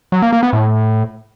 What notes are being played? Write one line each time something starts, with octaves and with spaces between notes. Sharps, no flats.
F#3
A#3
A#3
B3
A2